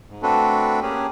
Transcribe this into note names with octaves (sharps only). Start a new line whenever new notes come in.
G#2
A3 C4 D4 F#4 A4 B4
A#3 C#4 G4 G#4